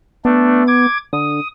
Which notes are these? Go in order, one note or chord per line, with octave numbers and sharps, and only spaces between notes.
A3 B3 D4
D6 G#6
D3 D#6